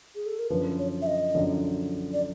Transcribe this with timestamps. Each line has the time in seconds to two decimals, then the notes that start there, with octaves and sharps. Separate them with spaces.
0.15 G#4
0.26 A4
0.39 A#4
0.50 F#2 D3 F3 B4
0.78 C#5
1.02 E5
1.06 D#5
1.35 F#2 D3 F3
2.13 D5